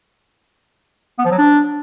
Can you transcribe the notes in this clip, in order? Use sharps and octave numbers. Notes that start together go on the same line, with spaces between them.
B3
F3
F#3
D4